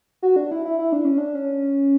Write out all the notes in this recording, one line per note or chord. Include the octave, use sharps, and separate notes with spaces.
F#4
D4
E4
E4
E4
D4
C#4
D4
C#4